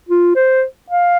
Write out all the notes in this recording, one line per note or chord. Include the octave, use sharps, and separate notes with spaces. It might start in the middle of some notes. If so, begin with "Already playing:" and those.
F4
C5
F5